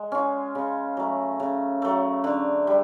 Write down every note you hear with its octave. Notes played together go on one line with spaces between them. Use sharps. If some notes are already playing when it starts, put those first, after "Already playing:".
Already playing: G#3
C#4 F4
C#3
F#3 A3
C#3
F#3 A3
D3
G3